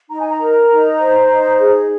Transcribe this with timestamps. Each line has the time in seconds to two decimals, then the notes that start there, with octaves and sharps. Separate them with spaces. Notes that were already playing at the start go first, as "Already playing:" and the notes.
0.10 D#4 A#5
0.20 G#5
0.29 A#5
0.40 A#4
0.70 D#4
1.00 C5
1.28 D#4
1.59 G#4